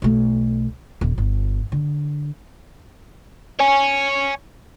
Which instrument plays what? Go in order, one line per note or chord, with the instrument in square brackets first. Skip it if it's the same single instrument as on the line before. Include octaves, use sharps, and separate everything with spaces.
[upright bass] B1 A3
D#1
G1
D3
[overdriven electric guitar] C#5 G#5